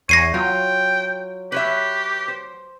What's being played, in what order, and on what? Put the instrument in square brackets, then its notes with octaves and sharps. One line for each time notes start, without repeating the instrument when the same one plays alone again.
[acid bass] E2 [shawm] C#5 [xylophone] A#6 C7 D#7
[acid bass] F#3 [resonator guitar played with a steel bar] F4 [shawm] G5
[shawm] G4 [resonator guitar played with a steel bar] B4 C#5 E5
[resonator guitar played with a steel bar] C5